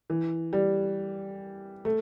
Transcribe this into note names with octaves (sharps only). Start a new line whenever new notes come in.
E3
G3
A3